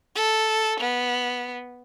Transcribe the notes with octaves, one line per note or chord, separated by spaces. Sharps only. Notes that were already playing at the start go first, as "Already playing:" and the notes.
A4
B3